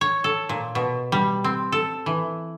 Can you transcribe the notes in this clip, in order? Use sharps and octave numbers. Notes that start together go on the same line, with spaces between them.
C#5
A4
A#2
B2
G3
C4
A4
E3